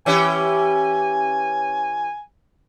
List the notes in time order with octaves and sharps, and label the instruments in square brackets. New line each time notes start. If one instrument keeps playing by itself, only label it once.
[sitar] E3 C#4 G4 [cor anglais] G#5